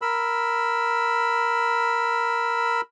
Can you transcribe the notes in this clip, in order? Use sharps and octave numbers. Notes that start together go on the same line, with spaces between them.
A#4 B5 E6